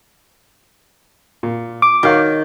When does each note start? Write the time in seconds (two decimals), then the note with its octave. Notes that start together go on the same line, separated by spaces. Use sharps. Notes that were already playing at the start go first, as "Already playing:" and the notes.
1.43 A#2
1.82 D6
2.03 D#3 F#4 C#5 F5